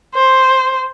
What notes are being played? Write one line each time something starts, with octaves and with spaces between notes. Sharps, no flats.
C5